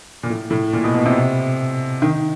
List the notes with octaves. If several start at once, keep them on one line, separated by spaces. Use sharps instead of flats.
A#2
A2
A2
A#2
B2
B2
C3
D#3